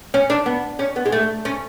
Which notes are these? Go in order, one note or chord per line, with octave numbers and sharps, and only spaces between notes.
C#4
D4
B3
C#4
B3
G#3
A3
C#4